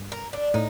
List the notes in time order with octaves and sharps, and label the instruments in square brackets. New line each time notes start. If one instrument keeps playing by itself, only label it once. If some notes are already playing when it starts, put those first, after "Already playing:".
Already playing: [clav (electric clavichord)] G2
[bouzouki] A#4
D4
[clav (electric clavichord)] A2 [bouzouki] D#4